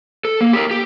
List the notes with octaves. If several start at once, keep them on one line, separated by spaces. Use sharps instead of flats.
A4
A#3
G4 A#4
G4